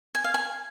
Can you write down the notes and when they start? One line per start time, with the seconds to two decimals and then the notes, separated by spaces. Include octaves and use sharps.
0.15 G#5
0.24 F5
0.34 G#5